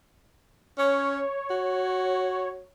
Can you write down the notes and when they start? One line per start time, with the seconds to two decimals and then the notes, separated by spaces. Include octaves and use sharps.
0.78 C#4 C#5
1.50 F#4